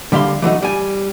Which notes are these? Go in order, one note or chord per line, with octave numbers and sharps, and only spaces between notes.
D3 G3 E5 F5 C6
E3 F#3 A3 D#4
G3 G#5